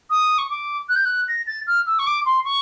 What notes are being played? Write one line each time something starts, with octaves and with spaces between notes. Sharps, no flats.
D#6
C#6
D6
F#6
G6
F#6
A#6
A6
F6
E6
C#6
D6
C6
C#6